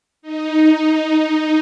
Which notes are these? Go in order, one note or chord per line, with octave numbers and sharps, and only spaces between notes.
D#4
D#4